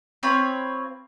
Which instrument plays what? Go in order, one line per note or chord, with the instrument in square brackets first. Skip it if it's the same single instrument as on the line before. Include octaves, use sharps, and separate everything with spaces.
[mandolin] C4 F4 C#5 B5